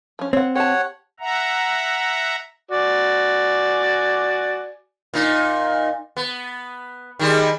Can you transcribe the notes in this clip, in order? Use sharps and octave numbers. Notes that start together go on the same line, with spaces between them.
F3 C#4
C4 C#5 F#5
G4 C#5 F#5 A5
E5 F#5 A#5
F#4 D5 G#5
A#2 D#4
B3
D#3 G3 G#3